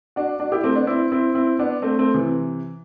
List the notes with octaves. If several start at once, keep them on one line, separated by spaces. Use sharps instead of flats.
D4 F#4
D4 F#4
E4 G4
A3 C4
B3 D4
C4 E4
C4 E4
C4 E4
B3 D4
A3 C4
A3 C4
C3 E3